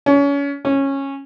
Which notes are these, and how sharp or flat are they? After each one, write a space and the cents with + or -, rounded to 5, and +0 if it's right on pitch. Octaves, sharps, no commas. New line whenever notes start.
C#4 +30
C#4 -15